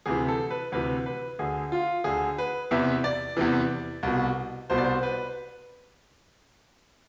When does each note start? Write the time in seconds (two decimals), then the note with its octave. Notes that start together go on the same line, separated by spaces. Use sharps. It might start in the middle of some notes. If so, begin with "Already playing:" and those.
0.06 D2 C3 E3 G#4
0.28 A4
0.51 B4
0.72 D2 C3 E3 B4
1.06 B4
1.39 D2 D3 G#4
1.72 F4
2.04 D2 D3 G#4
2.38 B4
2.71 E2 C3 E3 E5
3.04 D5
3.37 E2 C3 E3
4.03 C2 B2
4.70 C2 B2 C5
4.78 D5
4.84 C5
5.03 B4